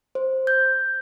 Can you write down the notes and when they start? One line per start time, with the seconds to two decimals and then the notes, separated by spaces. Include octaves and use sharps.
0.15 C5
0.47 G6